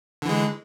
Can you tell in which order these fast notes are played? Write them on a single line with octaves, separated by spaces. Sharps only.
D3 E3 G#3